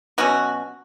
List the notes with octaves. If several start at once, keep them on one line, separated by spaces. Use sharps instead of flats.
B2 F#3 C#4 F#4